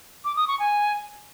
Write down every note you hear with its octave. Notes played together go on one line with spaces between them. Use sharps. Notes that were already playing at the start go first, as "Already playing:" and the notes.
D6
D#6
C#6
G#5